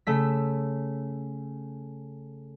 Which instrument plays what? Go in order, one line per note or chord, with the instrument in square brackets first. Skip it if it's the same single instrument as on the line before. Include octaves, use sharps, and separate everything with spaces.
[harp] C#3 A3 E5 B6